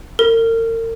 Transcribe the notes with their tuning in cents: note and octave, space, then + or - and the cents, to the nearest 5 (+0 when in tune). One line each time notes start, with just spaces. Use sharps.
A#4 -40